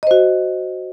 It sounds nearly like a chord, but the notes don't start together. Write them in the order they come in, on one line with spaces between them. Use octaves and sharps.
D#5 C5 F#4